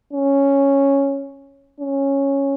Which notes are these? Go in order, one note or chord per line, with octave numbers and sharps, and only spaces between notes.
C#4
C#4